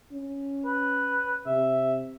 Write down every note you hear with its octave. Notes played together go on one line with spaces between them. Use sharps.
C#4
B4
C3 E5